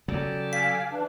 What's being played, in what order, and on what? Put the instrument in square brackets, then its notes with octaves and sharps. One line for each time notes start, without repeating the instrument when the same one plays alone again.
[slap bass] C#3 F#3 [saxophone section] G4 A4 D5
[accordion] F5 G#5 [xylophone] B6
[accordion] E3 D4